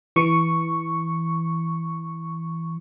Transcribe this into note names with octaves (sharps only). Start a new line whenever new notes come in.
E3 C#6